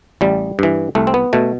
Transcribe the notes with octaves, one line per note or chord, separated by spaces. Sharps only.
A1 G3
G2 E3
C2 A3
C4
B3
B2 A3